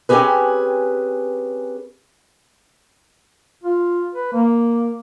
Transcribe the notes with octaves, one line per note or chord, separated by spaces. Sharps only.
C4 C#4 D#4 G4 G#4 B4
F4
B4
A#3